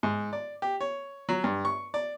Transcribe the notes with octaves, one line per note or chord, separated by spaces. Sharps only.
G#2
D5
G4
C#5
F#3
G2
C#6
D5